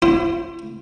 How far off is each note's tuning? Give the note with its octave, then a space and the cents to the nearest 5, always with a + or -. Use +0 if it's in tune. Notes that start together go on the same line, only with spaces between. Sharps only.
E4 +40 C5 +0